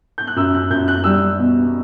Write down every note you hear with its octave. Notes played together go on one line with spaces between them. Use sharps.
G6
F#6
F#2 E6
F#6
F#2 G6
F#6
G3 E6
B2